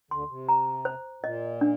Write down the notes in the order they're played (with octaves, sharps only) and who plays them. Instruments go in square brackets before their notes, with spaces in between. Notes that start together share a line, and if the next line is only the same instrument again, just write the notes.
[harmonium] D2 D3 [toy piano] C6
[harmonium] C3
[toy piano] A#5
C5
[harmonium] A#2 [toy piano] D#5
[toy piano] D4